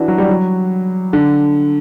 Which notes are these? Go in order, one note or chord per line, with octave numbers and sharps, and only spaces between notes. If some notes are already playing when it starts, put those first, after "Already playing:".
Already playing: E3 D4 E4 F#4
F#3
G3
F#3
D3